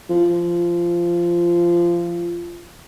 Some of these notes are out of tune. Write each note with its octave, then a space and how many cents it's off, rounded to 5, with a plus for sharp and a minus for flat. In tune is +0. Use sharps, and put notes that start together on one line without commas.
F3 -15